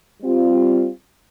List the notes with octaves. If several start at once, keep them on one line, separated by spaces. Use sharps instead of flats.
G3 C4 F4